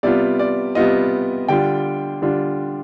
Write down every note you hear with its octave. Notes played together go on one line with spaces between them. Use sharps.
C3 G3 B3 F4 D5
D5
C3 G3 B3 F4 D#5
D3 G3 D4 F4 G5
D3 G3 D4 F4